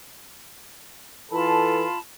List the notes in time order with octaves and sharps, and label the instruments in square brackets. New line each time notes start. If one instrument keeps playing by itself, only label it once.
[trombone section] E3 A4 [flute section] F4 A5 B5